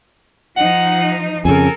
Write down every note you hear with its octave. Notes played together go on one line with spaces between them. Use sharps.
F3 D#4 F#5
F2 C#3 A4 A#4 G#5